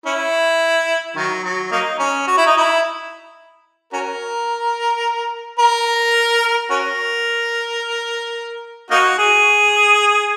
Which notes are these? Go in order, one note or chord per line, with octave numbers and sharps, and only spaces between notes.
C#4 E4
D#3 F#3
F#3
F#3 A#3 D#4
C#4
F#4
E4
D#4
E4
C#4 F#4 A#4
A#4
C#4 F#4 A#4
A#3 D#4 F#4
G#4